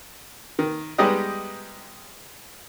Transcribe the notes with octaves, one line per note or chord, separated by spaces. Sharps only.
D#3
G3 G#3 B3 D#4 G4 D#5